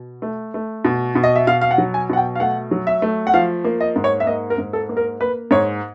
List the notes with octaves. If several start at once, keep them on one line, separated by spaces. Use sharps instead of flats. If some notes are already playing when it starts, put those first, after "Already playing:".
Already playing: B2
A3
A3
B2
B2
D#5
E5
B2 F5
F5
F#5
F#3
G#5
B2 F#5
G5
F5
A3 F#5
F#3
E5
A3
F#5
F3 F5
A#3
D#5
G#2
C#5
E5
A#3 D#5
A#4
G#2
A4
A#3
A#4
A#3 B4
G#2 C#5